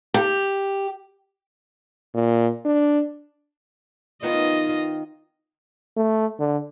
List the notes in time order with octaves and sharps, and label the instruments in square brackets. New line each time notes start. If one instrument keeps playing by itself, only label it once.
[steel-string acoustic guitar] G4
[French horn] A#2
D4
[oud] D#3 B3 D#4 [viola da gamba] F4 D#5
[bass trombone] A3
D3